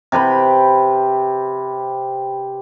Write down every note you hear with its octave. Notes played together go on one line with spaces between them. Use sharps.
C3 G4 B4 B5